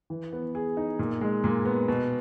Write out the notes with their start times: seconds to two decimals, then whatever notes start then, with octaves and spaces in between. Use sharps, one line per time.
0.10 E3
0.33 B3
0.55 G#4
0.77 D#4
0.99 A#2
1.21 G#3
1.44 A#2
1.65 B3
1.88 B2